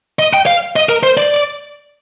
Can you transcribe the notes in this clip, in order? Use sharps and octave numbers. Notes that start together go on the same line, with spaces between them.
D#5
G5
F5
D#5
A#4
C5
D5